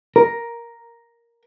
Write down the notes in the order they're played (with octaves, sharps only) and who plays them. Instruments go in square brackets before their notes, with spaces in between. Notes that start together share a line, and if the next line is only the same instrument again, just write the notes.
[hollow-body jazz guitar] A#4